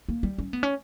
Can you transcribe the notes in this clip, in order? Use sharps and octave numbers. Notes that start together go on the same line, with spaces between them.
A#3
G3
C#4
B3
C#4